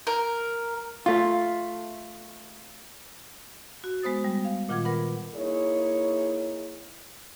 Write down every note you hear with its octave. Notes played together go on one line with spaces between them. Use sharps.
A#4
A3 F4
F#4
G#3 B3 C5 D#6 A6
G3
F5
A#2 D#3 F4 F#5 D6 G#6
A#4 B4 F#5 B5
A#3 D#4 E4 G#4 C#5